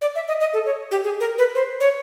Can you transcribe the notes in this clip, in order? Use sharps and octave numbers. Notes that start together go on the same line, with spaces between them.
D5
E5
D#5
D#5
A4
C#5
G4
G#4
A#4
B4
C5
C#5